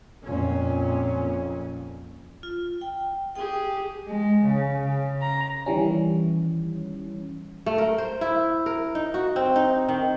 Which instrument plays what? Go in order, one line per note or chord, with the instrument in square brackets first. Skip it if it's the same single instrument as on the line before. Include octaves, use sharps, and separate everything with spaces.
[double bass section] F2 A#2 C#4
[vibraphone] F4
G5
[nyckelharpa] G4 G#4 [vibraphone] G5
[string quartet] G#3
C#3
C#3
A#5
[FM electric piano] D#3 E3 G3 C#4
[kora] A3
A#4
C5
E4
A#4
D#4
F#4
C4
D#4
D#3